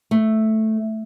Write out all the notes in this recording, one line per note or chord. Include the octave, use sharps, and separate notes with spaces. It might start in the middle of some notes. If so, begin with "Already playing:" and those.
A3